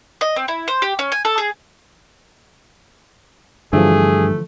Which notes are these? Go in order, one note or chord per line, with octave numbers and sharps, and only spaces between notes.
D#5
C4
E4
C5
G4
C#4
G#5
A4
G#4
G2 D3 E3 F3 A3 G#4